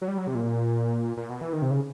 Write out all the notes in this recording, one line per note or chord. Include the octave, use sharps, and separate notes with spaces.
F#3
G3
F#3
C3
A#2
A#2
B2
E3
D#3
C3
C#3